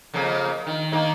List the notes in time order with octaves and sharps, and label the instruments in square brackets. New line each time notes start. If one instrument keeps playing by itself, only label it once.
[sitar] F2 C#3 A#3
D#3
D#3 A#3 D#4